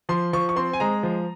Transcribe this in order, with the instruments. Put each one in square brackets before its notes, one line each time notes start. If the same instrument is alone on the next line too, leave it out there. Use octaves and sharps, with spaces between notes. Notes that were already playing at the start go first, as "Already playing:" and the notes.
[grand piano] F3 C6
F3 C#6
C#6
C4 C6
G#5
G#3 A#5
F3